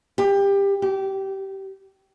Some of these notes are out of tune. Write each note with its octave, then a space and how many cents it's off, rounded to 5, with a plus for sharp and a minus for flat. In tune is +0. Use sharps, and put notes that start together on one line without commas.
G4 +20
G4 -20